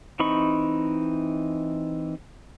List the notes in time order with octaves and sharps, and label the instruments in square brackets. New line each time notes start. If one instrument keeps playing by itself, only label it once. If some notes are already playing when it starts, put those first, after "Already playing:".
[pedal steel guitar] E3 C4 D#4 B5 C#6